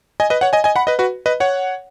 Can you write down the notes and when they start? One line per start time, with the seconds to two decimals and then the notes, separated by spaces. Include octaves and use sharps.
0.20 D#5 G#5
0.30 B4 D#5
0.41 C#5 F#5
0.53 D#5 G#5
0.64 D#5 G#5
0.76 F#5 B5
0.87 B4 D#5
0.99 F#4 B4
1.26 B4 D#5
1.40 C#5 F#5